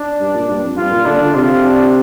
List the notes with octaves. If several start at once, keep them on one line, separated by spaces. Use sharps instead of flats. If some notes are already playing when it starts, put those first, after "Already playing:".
Already playing: D4
G2
A#2
G2
F2
G2 F4
A#2
D3 D4
D3
C3 F4
D4